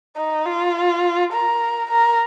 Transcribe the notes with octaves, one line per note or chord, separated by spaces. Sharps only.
D#4
F4
A#4
A#4